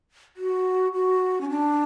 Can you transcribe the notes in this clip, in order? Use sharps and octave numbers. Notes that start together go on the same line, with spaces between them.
F#4
F#4
C#4
D4